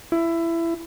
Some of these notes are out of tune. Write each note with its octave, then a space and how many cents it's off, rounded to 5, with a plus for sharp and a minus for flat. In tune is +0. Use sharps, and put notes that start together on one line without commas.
E4 +20